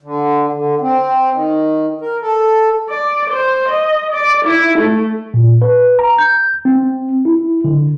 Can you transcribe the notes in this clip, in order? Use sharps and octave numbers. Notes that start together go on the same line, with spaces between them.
D3
D3
C4
D#3
A#4
A4
D5
C5
D#5
D5
E4
A3
A#2
B4
A#5
G6
C4
E4
D3